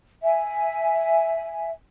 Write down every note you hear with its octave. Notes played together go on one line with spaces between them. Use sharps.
E5 G#5